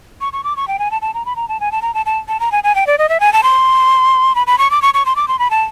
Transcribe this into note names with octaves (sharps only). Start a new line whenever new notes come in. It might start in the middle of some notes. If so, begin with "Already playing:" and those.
C#6
C#6
D6
C#6
G5
G#5
A5
A5
A#5
B5
A#5
A5
G#5
A5
A#5
A5
A5
A5
A#5
G#5
G#5
G5
D5
D#5
E5
G#5
A5
C6
B5
B5
C#6
D6
C#6
C#6
C6
D6
C6
B5
A5